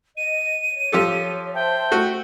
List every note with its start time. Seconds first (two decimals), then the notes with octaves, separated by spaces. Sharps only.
0.17 D#5 D#7
0.71 C#5
0.92 F3 G4 A4
1.54 C5 E5 G5 A5
1.91 A3 F#4